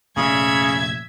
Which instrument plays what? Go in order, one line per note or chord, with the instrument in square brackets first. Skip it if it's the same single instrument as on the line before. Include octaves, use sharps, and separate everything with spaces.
[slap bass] F1 A#2 A3 [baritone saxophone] C#3 [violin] E5 G#6